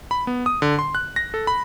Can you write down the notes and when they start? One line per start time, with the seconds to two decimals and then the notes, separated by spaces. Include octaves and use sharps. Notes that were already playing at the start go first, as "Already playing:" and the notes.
0.11 B5
0.27 B3
0.46 D#6
0.62 D3
0.79 C6
0.95 F#6
1.16 A#6
1.34 A4
1.47 B5